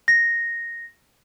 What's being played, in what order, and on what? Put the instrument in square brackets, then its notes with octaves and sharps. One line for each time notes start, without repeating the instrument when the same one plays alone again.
[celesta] A#6